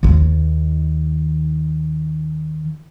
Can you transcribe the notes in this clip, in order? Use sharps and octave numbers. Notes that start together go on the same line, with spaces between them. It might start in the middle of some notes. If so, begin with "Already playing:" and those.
D#2 D#3